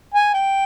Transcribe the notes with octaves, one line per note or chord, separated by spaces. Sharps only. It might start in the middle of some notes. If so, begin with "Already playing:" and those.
G#5
G5